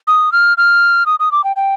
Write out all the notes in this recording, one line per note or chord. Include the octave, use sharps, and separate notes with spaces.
D#6
F6
F6
D#6
D#6
D6
G5
G5